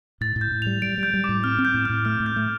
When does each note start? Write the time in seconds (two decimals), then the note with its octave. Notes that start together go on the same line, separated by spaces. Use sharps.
0.21 A2 A6
0.36 A2
0.41 G6
0.52 A2
0.62 G3 F7
0.82 G3 D7
0.98 G3
1.03 G6
1.14 G3
1.24 A2 D6
1.44 C4 F6
1.59 C4
1.65 G6
1.74 A2
1.85 A2 F6
2.05 A3 F6
2.20 A2
2.26 G6
2.36 A3